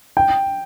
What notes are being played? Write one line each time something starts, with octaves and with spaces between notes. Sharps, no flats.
G5